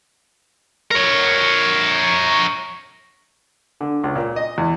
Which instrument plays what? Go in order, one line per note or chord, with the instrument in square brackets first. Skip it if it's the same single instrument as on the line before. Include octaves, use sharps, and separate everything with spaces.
[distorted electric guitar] A#4 C#5
[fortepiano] D3
C#2
A#2
D#5
E2